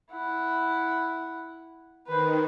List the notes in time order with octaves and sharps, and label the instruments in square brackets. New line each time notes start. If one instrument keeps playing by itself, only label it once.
[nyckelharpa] E4 F#5
[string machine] D#3 [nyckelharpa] B4 C5